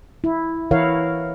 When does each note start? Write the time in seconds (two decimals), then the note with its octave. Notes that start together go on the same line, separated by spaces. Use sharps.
0.24 E4
0.71 E3 E4 A#4 C#5 F5 F#5